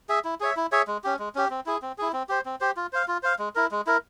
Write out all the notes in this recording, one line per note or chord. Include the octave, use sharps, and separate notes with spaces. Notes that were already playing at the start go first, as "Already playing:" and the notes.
G#4 E5
E4
G#4 C#5 E5
E4
G#4 C#5 E5
G#3
C#4 G4
G#3
C#4 G4
C4
E4 G#4
C4
E4 G#4
C4
G4 C5
C4
G4 C5
F4
C5 F5
F4
C5 F5
G#3
E4 A#4
G#3
E4 A#4